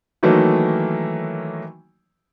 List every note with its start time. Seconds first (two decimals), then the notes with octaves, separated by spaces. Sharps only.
0.23 D#3 E3 F#3 A3 A#3